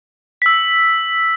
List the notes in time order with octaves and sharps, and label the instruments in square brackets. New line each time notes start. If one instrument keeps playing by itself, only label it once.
[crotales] E6 B6